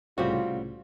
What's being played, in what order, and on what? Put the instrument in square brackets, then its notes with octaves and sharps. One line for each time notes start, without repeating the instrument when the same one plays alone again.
[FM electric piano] C2 A2 C#3 [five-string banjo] G3 C4 F#4 [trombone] F4